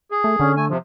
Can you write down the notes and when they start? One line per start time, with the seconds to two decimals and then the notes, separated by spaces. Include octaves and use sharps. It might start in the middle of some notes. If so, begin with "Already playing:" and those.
0.11 G#4
0.24 A3
0.40 D3 C#4
0.57 A3 G#5
0.70 C3 F3